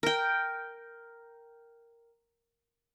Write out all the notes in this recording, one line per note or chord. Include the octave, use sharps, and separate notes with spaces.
A#4 G5